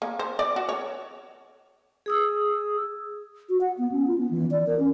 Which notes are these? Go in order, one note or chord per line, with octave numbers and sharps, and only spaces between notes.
A#3
C5
D5
F#4
C#5
G#4 D#6 E6
F#4
F#5
B3
C#4
F4
B3
E3
D5
A#4
C#4